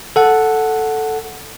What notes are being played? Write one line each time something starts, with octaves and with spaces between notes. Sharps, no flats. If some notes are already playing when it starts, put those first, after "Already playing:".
A4 F#5